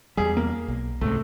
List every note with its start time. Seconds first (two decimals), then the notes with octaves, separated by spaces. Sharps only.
0.17 E2 G3 G#4
0.37 A#3
0.68 B1
1.01 C#2 G#2 C3 A3